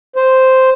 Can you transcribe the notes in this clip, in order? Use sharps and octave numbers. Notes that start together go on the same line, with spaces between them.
C5